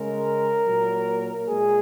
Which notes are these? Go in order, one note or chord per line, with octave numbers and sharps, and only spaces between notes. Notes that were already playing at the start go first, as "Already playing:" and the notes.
Already playing: C#3 G#3 A#4
A#2 F#3 A#3
A#2 G#3 G#4